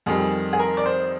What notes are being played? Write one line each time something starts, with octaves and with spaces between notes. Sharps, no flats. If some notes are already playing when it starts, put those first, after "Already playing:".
F2 D#3 G3 G#4
G#4
A#4
D5
C5